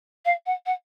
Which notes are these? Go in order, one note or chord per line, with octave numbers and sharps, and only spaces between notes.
F5
F#5
F#5